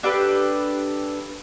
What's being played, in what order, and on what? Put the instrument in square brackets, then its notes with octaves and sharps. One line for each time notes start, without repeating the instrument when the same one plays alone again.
[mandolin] D4 G4 A4 B4